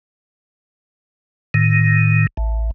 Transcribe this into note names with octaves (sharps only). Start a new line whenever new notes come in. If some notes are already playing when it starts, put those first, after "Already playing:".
A2 D#3
A1